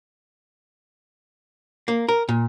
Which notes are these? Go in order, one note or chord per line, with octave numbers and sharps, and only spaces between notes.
A#3
A#4
A#2